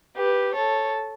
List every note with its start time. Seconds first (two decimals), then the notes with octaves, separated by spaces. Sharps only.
0.17 G4 B4
0.54 A4 C#5